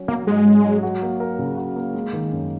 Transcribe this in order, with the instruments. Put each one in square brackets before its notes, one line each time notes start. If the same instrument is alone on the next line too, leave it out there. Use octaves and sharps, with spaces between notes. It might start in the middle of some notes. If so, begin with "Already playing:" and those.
Already playing: [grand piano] F#3 C#4
[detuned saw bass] A#3 [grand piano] F#4
[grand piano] G#2 [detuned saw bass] G#3
[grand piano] C#4
F#3
F#4
A#3
A#4
C#3
F#4
A#3
G#3
D#3
F#2